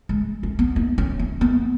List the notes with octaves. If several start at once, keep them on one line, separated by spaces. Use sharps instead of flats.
G#3
C#4
B3
D#4
C#4
C#4
B3